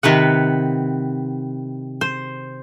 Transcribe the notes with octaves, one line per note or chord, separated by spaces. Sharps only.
C3 D#3 B4 F#5
C5